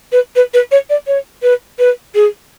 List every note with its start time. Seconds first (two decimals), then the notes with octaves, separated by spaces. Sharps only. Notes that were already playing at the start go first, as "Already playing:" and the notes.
0.12 B4
0.36 B4
0.54 B4
0.71 C#5
0.90 D5
1.07 C#5
1.43 B4
1.79 B4
2.15 G#4